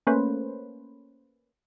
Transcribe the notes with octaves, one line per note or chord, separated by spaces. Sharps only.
A3 A#3 C#4 B4 C5